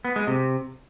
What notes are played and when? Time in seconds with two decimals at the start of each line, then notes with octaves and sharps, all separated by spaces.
0.05 B3
0.16 G#3
0.27 C3